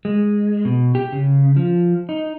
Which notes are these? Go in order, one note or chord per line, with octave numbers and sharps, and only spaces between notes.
G#3
B2
G4
C#3
F3
D#4